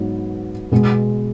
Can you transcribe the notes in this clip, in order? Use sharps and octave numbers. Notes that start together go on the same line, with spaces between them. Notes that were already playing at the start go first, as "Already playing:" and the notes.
Already playing: G#2 F#3 B3
B2 G#3 B3 G#4